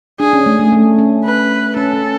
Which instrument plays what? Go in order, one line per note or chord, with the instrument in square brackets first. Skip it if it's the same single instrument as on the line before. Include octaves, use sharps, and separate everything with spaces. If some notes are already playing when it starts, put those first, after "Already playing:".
[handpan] D4 [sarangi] G#4
[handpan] C#4
A3
A3
A3
C#4
[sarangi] B4
[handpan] C#4 [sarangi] A4
[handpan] C#4